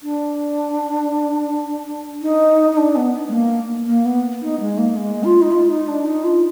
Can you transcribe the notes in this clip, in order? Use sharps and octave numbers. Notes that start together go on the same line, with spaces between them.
D4
D#4
D#4
D4
B3
G#3
A#3
A#3
B3
D#4
G#3
A#3
G#3
F4
D#4
F4
D#4
D4
D#4
F4